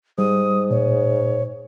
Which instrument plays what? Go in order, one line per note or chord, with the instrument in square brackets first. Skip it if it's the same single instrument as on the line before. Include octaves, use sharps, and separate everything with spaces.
[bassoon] G#2 [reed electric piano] G3 [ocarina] D#6
[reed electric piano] A#2 [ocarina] C#5